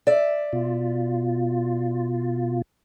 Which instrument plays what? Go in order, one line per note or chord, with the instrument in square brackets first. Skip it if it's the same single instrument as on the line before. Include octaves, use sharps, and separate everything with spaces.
[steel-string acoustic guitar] D5 E5
[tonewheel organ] B2 F4